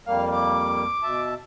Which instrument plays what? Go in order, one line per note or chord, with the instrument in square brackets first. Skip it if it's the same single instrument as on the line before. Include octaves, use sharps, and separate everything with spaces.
[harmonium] F2 G3 A#3 [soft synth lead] F5
[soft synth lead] D6
[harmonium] B2 E5 A5